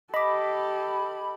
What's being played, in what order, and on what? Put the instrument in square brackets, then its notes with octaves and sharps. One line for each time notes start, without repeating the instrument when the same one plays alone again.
[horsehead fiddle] G4 A4 [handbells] D#5 D6 [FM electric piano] B5